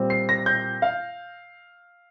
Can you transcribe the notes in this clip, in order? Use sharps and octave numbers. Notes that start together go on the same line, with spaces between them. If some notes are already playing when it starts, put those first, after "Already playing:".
Already playing: A#2 G3 C4
C7
A#6
G6
F5